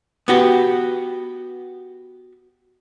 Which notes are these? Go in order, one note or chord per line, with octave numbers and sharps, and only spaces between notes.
B3 F#4 G4